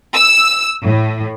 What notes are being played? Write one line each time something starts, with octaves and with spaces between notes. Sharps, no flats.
E6
A2